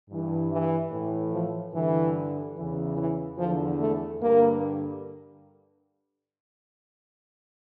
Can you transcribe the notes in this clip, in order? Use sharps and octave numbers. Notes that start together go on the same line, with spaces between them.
G2 E3
E3
A2 E3
F3
G2 D3 E3
E2 C#3 E3
E3
E2 D3 F3
A3
G2 D3 A#3